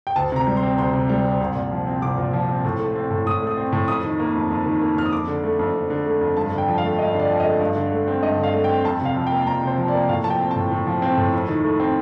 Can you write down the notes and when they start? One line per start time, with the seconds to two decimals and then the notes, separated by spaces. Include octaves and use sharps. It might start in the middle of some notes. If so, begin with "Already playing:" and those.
0.07 G5
0.16 D2 A5
0.32 C3 A#5
0.47 G3
0.57 C6
0.63 C4
0.78 D2 C6
0.93 C3
1.09 G3
1.24 C4
1.41 C2
1.55 A#2
1.72 F3
1.87 C4
2.02 C2 D6
2.18 A#2
2.33 F3
2.49 C4
2.64 A2
2.79 A3
2.95 C4
3.10 A2
3.26 A2 D#6
3.42 A3
3.47 D#6
3.57 C4
3.72 A2
3.88 F2 D#6
4.04 D#3
4.20 A#3
4.35 F2
4.51 F2
4.66 D#3
4.81 A#3
4.96 F2 F6
5.05 D#6
5.12 F2 D6
5.28 D3
5.44 A3
5.59 F2
5.75 F2
5.90 D3
6.06 A3
6.21 F2
6.37 G2 A5
6.52 D3
6.58 G5
6.68 F3
6.78 F5
6.83 A3
6.99 G2 D#5
7.14 D3
7.19 D5
7.30 F3
7.40 D#5
7.45 A3
7.60 G2
7.76 D3
7.92 A3
8.08 C4
8.23 G2 D#5
8.38 D3
8.44 F5
8.54 A3
8.64 G5
8.69 C4
8.84 F2 A5
9.01 C3 F5
9.16 F3
9.27 G5
9.31 A#3
9.42 A5
9.47 F2 A#5
9.63 C3 C5
9.78 F3
9.88 D5
9.94 A#3
10.09 A2 F5
10.24 F3 A5
10.30 G5
10.40 C4
10.51 A5
10.56 A2
10.71 A2
10.87 F3
11.02 C4
11.17 A2
11.33 F2
11.48 D#3
11.64 A3
11.80 C4